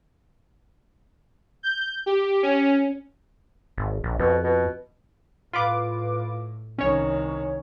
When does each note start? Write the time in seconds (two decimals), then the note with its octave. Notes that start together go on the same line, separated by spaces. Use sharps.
1.63 G6
2.06 G4
2.43 C#4
3.78 G#1
4.04 A#1
4.19 F2 B2
4.44 B2
5.53 A2 F4 B4 D6
6.78 C2 D#3 C#4 C#5